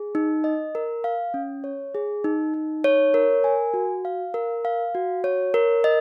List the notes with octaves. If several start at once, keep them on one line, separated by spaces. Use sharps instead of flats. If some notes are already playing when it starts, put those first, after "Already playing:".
Already playing: G#4
D#4
D#5
A#4
F5
C#4
C#5
G#4
D#4
D#4
C#5
A#4
G#5
F#4
F5
A#4
F5
F#4
C#5
A#4
D#5